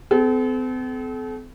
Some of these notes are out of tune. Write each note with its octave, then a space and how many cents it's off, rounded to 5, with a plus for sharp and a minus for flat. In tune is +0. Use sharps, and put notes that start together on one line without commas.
C4 -45 A4 -40